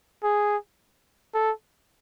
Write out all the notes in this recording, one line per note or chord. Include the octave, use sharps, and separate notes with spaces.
G#4
A4